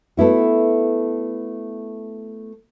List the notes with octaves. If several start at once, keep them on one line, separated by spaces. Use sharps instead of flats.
A3 B3 E4 F#4